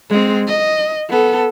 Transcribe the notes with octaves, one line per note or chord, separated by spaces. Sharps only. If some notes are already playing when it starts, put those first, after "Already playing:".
G#3 C4
D#5
B3 A4